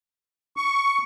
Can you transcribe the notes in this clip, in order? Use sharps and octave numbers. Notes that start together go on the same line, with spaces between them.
C#6